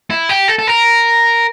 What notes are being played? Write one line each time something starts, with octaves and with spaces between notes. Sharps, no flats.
E4
G4
A4
A4
A#4